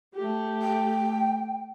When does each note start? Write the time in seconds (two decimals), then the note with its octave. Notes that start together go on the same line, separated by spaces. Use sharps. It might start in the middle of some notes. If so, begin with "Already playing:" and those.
0.16 A3 G4
0.61 G5